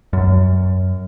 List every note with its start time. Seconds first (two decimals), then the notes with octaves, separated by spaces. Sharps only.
0.13 F#2